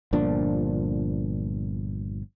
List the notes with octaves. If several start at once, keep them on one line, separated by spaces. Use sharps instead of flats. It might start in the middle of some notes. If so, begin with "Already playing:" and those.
G1 A#2 F3 D4